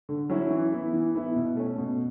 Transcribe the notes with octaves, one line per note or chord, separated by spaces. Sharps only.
D3
F#3 C#4 E4
E3
B3 E4
E3
B3 E4
B2
A3 C#4
B2